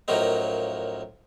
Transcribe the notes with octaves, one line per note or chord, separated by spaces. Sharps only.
F#2 A2 F3 F#3 A#3 D#4